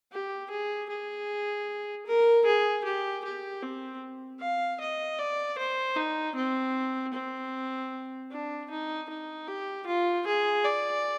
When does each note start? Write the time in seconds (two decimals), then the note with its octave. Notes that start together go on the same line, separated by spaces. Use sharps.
0.12 G4
0.51 G#4
0.90 G#4
2.07 A#4
2.46 G#4
2.84 G4
3.25 G4
3.63 C4
4.40 F5
4.81 D#5
5.18 D5
5.58 C5
5.96 D#4
6.36 C4
7.14 C4
8.31 D4
8.70 D#4
9.09 D#4
9.48 G4
9.87 F4
10.26 G#4
10.65 D5